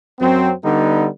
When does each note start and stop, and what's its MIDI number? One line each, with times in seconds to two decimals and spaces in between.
0.21 0.52 42
0.21 0.52 54
0.21 0.52 60
0.64 1.07 50
0.64 1.07 55
0.64 1.07 59
0.64 1.07 63